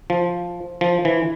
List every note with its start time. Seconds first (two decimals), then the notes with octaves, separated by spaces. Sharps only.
0.10 F3
0.81 F3
1.05 E3